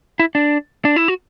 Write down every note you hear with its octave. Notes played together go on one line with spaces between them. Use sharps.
E4
D4
D4
E4
F#4